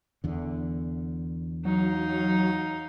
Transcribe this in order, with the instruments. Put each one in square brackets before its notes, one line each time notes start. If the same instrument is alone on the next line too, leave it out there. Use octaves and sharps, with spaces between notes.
[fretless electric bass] E2 D3
[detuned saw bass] F#3 [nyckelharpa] D#4 F5